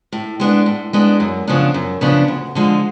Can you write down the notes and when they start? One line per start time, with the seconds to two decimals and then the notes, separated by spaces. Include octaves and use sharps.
0.12 A2
0.40 G#3 B3 D4
0.66 A2
0.93 G#3 B3 D4
1.20 F#2
1.47 C#3 F3 B3 D4
1.74 F#2
2.01 C#3 F3 B3 D4
2.28 D2
2.55 D3 F3 G#3